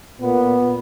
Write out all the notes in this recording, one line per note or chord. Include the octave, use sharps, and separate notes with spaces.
A#2 B3